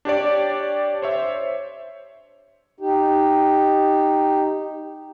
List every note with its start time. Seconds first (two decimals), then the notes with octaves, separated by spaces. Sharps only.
0.05 D4 G4 C#5 D5
1.02 C5 C#5 E5
2.80 D#4 G4